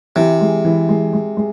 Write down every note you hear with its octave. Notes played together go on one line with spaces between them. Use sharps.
C3 E3
G#3
E3
G#3
G#3
G#3